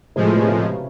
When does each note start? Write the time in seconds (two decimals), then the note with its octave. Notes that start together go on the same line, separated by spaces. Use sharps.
0.16 A2 C3 F3 G#3 C4
0.31 B2 B3
0.47 C#3 C#4